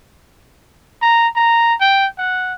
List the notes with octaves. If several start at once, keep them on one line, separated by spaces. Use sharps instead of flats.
A#5
A#5
G5
F#5